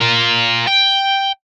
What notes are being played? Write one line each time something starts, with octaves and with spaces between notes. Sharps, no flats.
F4 A#4
G5